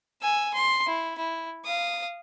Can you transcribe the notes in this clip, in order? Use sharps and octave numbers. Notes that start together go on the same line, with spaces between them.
G#5 E6
C6
E4
E4
F5 D#6